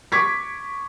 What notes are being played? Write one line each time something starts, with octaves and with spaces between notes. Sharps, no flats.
C#6 D6 G#6 B6